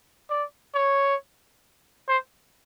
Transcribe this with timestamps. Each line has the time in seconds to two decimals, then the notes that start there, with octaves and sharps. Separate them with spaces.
0.30 D5
0.75 C#5
2.08 C5